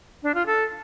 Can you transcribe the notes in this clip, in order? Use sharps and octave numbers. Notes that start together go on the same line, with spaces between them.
D4
F4
A4